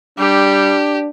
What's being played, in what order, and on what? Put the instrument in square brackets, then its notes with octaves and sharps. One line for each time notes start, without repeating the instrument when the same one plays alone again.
[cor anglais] G3 [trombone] D4 [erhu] G4